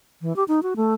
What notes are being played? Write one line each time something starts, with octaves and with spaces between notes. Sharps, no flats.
E3
G4
D#4
F#4
A3